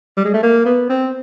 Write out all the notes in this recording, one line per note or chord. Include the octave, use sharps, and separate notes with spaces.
G3
G#3
A3
A#3
B3
C4